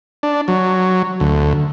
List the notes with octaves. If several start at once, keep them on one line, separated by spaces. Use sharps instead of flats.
D4
F#3
D2